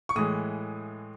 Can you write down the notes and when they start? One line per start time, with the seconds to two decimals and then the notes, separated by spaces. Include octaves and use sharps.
0.09 C#6
0.16 A2 E3 G#3 D#6